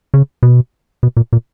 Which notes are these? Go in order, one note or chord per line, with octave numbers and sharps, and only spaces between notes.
C#3
B2
B2
A#2
A#2